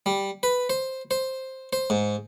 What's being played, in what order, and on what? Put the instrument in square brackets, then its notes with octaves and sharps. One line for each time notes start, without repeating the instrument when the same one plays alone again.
[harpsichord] G3
B4
C5
C5
C5
G#2